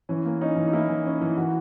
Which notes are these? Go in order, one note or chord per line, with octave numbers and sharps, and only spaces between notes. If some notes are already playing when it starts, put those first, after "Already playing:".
E3 C#4
A#3
C#4 D#4
E3
D#4
A#3 E4
E3
C#4
E3
E3 F#4